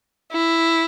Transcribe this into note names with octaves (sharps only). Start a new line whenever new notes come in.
E4